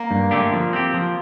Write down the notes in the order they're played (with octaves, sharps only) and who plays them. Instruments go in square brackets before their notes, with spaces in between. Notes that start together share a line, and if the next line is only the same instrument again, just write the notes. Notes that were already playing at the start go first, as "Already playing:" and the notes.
Already playing: [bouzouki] A#3
[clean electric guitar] G2
D3 A3 D4 G4
F3
C4 G4
F3